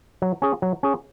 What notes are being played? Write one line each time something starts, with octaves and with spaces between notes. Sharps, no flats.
F#3
C#4 G#4
F#3
C#4 G#4